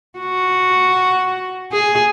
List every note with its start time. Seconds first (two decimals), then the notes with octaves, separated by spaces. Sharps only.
0.19 F#4
1.72 G#4